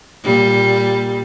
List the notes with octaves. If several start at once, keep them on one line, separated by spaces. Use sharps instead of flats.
A#2 G3